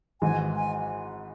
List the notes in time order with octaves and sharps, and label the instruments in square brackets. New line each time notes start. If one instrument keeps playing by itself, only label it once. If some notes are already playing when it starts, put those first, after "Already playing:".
[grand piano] G#1 G#2 E3 [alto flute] G#5
[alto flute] G#5